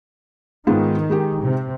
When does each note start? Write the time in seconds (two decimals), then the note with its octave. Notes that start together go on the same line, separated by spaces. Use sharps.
0.67 G#2 D#3 B3 F4
1.10 G#3 D#4 G4
1.43 C3